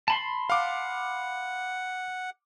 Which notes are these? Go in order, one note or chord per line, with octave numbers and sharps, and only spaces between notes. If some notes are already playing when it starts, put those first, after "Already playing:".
A5 B5 C6
F5 F#5 D6